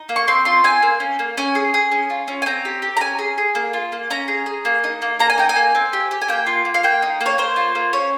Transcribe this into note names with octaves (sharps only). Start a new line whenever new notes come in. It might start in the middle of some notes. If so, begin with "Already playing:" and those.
Already playing: D#4
A#3
C#6
C4 C6
F4 C6
C4 G#5
A#3
C#4
A#3
C#4 G#5
G#4
G#4
C#4
F4
C#4
G#5
C4 A#5
G4
G4
A#5
C#4 G#5
G#4
G#4
A#3
F4
A#3
C#4 A#5
G#4
G#4
A#3
D#4
A#3
A#3 A#5
G#5
D#4 G5
G#5
A#3
C4
G4
G4
G#5
A#3 G5
F4
A#3
F5
A#3 G5
D#4
A#3
C#5
A#3 C5
F4
A#3
C#4 C#5